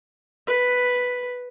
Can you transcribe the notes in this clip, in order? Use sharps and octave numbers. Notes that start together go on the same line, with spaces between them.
B4